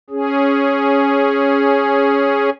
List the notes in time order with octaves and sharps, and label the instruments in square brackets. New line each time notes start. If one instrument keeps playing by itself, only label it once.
[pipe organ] C#4 G#4